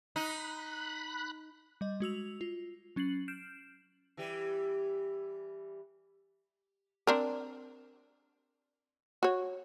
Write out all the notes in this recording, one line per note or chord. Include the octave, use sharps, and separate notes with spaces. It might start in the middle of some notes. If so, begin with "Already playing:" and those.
D#4 B5 F#6
G3 D#5
G#3 F#4 E6 F7
F4
F#3 C#4 A6 C7 F#7
F6 G6 C7 D7 E7
E3 G3 G4
C4 D4 A#4
F#4 C#5